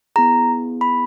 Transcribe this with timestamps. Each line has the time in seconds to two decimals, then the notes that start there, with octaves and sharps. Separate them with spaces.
0.16 B3 E4 G#4 A#5
0.81 B5